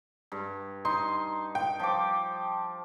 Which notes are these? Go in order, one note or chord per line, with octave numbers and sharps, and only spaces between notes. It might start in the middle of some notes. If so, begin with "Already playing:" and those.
G2
D#4 C6
G5
F3 D6